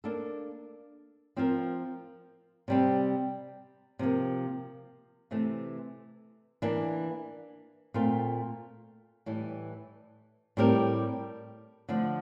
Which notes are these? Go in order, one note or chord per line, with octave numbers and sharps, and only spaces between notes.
A#3 D4 A4
F3 C4 F4 A#4
C3 G3 C4
C3 F3 A#3
C3 E3 A3
E3 A#3 D4
A#2 A3 C4 F4
A2 E3 G3
A2 G3 C4 G4 A#4
D3 F3 A3